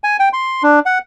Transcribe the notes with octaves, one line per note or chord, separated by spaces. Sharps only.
G#5
G5
C6
D4
F#5